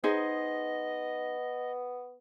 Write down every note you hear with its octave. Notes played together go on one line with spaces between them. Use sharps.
B3 D#4 G#4 C5 D#5